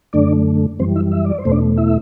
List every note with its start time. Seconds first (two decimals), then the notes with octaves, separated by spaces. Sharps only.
0.13 F#2 D3 A3 D4 D5
0.79 F#2 E3 G3 C4 C5
0.96 E4 E5
1.12 E5
1.25 D5
1.38 C5
1.45 E2 B2 A3
1.51 D4 D5
1.78 E4 E5